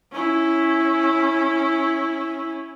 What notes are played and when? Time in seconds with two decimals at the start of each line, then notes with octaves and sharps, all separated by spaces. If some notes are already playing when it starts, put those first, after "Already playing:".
0.12 C#4 E4